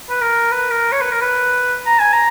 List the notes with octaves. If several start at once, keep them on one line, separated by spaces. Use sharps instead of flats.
B4
A#4
B4
A#4
C#5
B4
A#4
B4
A#5
G#5
A#5